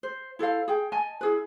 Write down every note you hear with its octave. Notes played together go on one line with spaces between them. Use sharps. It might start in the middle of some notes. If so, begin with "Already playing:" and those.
C5
E4 A4 C5 F5
G#4 G5
D#5 G#5 A5
E4 G#4 B4